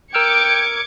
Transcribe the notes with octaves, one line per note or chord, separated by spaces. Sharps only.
A#4 G5 D6 E6 F6 G#6 C#7